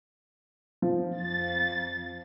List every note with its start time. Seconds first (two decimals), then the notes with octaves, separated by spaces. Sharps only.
0.82 F3
1.19 F2 A6